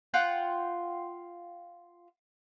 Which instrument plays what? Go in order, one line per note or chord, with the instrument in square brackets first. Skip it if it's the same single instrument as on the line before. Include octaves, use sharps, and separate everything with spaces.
[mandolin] F4 F#5 G5